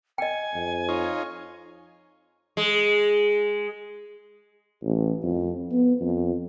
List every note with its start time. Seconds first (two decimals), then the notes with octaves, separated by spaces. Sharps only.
0.18 D#5 G5 G#5
0.54 F2
0.89 D#4 F4 C#5
2.57 G#3
4.83 A1
5.23 F2
5.72 B3
6.01 F2